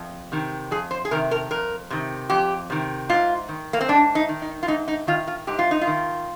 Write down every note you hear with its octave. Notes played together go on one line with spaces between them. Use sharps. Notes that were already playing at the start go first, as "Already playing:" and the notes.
Already playing: F2
C3 D#3
F2 G#4
C5
G#4
C3 D#3 A#4
A#4
F2 A#4
C3 D#3
F2 G4
C3 D#3
G#2 F4
D#3
A#3
C4
G#2 D4
D#4
D#3
D#4
F4
G#2 D#4
D#4
D#3 F4
F4
G#2 G4
F4
D#4
F4
D#3